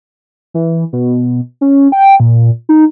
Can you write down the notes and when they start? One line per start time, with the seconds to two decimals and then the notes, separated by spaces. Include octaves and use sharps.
0.54 E3
0.93 B2
1.61 C#4
1.92 G5
2.20 A#2
2.69 D#4